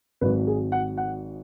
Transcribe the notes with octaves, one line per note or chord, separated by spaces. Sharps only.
G#1 G#2 F#3 B4
G#4
F#5
F#5